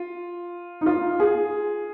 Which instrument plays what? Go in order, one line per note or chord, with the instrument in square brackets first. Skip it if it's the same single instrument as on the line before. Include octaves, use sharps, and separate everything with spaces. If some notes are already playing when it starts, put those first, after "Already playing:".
Already playing: [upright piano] F4
D#4
F4
G#4